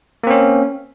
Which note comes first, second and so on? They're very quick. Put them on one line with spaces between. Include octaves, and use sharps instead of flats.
A#3 C4 C#4